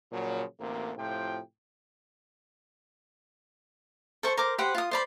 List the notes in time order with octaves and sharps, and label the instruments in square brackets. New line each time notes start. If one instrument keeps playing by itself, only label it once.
[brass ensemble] A#2 C#3 F3 F#3
A1 D2 C3 A#3
A2 C3 F3 F4 G5
[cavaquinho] A4 C5 C#6
A#4 C5 D6
G4 B4 C5 F#5
F4 D#6
C5 D5 B5